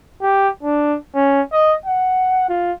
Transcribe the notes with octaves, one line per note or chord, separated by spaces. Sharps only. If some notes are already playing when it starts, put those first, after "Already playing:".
G4
D4
C#4
D#5
F#5
F4